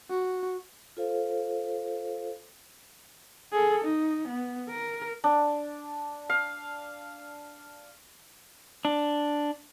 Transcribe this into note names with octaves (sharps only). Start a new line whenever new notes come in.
F#4
F4 A4 C5 F5
G#4 A4
D#4
B3
A#4
D4
F5
D4